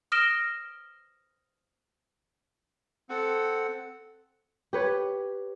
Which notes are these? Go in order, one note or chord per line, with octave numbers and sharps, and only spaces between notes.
D#6 F6 A#6 D7 E7 G7
C4 A4 F#5
G4 B4 C#5